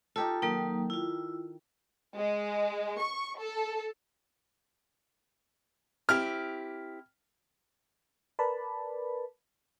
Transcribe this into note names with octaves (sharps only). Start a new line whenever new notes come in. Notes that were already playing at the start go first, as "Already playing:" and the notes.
D#4 F4 G4 A4
D#3 F#3 A#3 D#4
E4 F4
G#3
C#6
A4
C4 E4 G4 F6
A#4 B4 D5 A5 B5